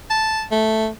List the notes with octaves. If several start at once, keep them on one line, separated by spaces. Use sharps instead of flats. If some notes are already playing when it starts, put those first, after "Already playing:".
A5
A3